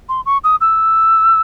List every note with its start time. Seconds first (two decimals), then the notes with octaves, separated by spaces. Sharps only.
0.09 C6
0.26 C#6
0.44 D#6
0.61 E6